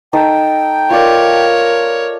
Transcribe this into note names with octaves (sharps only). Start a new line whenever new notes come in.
D#4 A4 G5 D#6
F4 A#4 C#5 D5